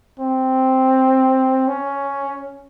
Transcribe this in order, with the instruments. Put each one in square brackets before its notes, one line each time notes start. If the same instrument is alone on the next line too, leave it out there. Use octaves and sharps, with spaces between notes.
[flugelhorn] C4
C#4